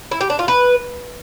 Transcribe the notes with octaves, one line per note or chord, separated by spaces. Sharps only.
E4
G4
D4
F4
B4